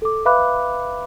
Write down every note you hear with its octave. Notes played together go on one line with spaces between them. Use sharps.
A4 D6
B4 E5 F5 B5 D6 F#6